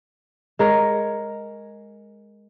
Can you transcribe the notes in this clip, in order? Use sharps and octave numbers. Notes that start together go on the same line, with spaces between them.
G#3 A#4 C#5